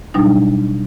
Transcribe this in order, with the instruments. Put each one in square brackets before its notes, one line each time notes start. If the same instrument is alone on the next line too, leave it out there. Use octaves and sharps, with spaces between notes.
[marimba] B2 F#3 G3 D4 D#4